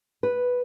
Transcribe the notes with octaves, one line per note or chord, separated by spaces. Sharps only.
B4